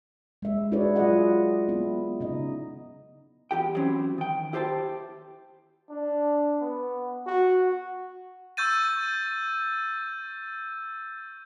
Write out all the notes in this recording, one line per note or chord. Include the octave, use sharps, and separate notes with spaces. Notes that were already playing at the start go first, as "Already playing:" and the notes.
G#3 E5
E4 F#4 G#4 B4 C#5 D5
F#3 F4 F#4 G#4 D#5 F#5
B3 E4
C#3 D#4 D#5
E2 G4 G5
E3 F#3 C4 C#4 E4
D#3 G5
E4 G4 C5 G5 A5
D4
B3
F#4
C#6 E6 G6 A6 D#7